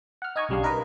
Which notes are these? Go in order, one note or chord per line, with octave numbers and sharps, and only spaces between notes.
F#5 F6
D#4 D#5 G#5 A#5 C#6
B1 C#3 G3 D4 F5
D#4 A#4 B4 D#5